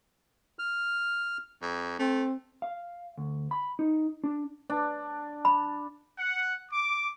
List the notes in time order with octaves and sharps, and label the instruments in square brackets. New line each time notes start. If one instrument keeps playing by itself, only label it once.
[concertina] F6
[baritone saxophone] F2
[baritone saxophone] A3 [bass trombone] C4
[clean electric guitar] F5
D2
B5
D#4
D4
[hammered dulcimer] D4
[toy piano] B5
[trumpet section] F#5
D6